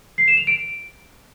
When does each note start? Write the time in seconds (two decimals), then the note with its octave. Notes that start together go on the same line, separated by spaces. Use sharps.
0.18 C7
0.28 E7
0.37 F7
0.47 D7